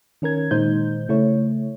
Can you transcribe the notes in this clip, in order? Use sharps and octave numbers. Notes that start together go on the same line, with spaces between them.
D#3 C#4 A#4 G#6
A#2 D#3 G#3 D#4 C5 G6
C#3 A3 E4 C#5